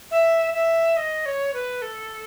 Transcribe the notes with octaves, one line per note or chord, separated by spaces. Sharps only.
E5
E5
D#5
C#5
B4
A4